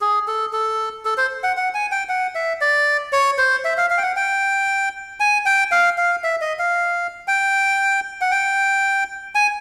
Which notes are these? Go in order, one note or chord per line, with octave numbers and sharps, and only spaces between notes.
G#4
A4
A4
A4
C5
F#5
F#5
G#5
G5
F#5
E5
D5
C#5
C5
E5
F5
F5
G5
F#5
G5
G#5
G5
F5
F5
E5
D#5
F5
G5
F#5
G5
G#5